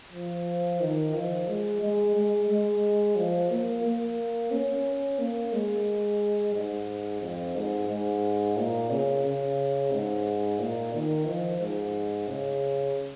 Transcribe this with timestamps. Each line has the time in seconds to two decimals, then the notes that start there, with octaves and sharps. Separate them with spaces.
0.12 F3
0.80 D#3
1.14 F3
1.48 G#3
1.81 G#3
2.15 G#3
2.49 G#3
3.16 F3
3.50 A#3
3.84 A#3
4.51 C#4
5.19 A#3
5.53 G#3
6.54 G#2
7.21 F2
7.55 G#2
7.89 G#2
8.57 A#2
8.90 C#3
9.25 C#3
9.92 G#2
10.59 A#2
10.93 D#3
11.27 F3
11.60 G#2
12.28 C#3